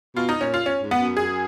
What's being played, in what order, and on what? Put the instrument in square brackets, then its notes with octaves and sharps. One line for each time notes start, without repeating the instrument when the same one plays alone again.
[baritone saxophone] B2 [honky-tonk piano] F4
[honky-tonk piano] D#4
[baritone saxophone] A#2 [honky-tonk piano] C#4
[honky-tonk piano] F4
C#4
[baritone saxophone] G#2
[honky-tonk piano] B3
[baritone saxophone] F#2
[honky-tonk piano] G#4